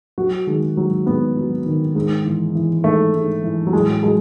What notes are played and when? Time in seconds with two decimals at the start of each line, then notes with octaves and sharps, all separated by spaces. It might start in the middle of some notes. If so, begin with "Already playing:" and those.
0.18 F#3 F#4
0.47 D#3 G#3
0.77 G#2 F#3
1.06 G#2 B3
1.37 F#3
1.66 D#3
1.95 G#2
2.25 E3
2.55 E3
2.84 G#2 A3
3.15 G#2
3.44 E3
3.67 F#3
3.73 A2 G#3
4.03 F#3 G#3